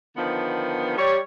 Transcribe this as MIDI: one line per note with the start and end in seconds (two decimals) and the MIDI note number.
0.17 0.96 50
0.17 0.96 51
0.17 0.96 53
0.17 0.96 59
0.97 1.19 55
0.97 1.19 73